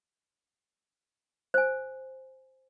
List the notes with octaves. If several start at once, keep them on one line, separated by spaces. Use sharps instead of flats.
C5 G#5